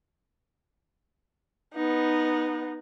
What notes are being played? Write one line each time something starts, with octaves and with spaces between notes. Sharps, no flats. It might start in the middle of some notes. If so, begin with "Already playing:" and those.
B3 D#4